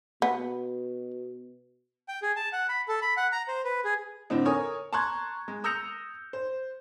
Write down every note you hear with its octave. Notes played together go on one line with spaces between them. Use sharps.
B2 B3
G5
G#4
A5
F#5
B5
A4
B5
F#5
A#5
C5
B4
G#4
A2 D3 C4 D4 D#4
A4 A#4 C#5 G#5 D#6
A5 A#5 C6 C#6 F#6 G#6
G#3
D#6 E6 G6 A#6 C#7 F7
C5